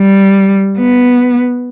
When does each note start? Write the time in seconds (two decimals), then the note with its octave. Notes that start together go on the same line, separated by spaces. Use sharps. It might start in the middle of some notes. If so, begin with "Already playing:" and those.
Already playing: G3
0.77 B3